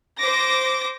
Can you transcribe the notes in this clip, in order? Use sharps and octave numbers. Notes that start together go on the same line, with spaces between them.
C5 D6 A#6